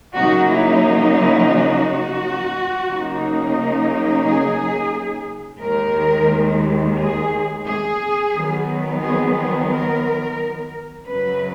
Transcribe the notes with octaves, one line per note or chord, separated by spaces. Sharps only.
C#3 F#3 A#3 D#4 F#4
E4
E4
F#4
C#3 F#3 A#3 D#4
G#4
D#2 D#3 G#3 A#4
G#4
G#4
D#3 F#3 B3
G#4
G#4
A#4
F#2 C#3 F#3 B4